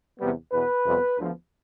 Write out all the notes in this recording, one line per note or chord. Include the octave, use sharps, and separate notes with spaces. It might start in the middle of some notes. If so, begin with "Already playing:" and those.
E2 C3 G3 B3
E2 B2 B3 B4
F2 C3 G3 B3
D2 D3 F3 B3